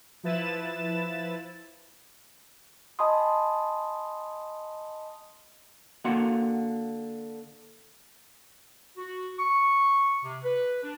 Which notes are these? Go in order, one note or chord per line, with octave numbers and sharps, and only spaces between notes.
F3 E4 B4 A6 E7
D#5 G#5 A5 B5 C6 D#6
D3 A#3 F#4 F#5 A#5 C6
F#4
C#6
C3
B4
D4